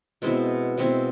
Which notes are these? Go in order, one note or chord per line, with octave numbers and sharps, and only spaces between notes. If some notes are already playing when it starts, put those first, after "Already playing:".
B2 G#3 C4 E4
B2 G#3 C4 E4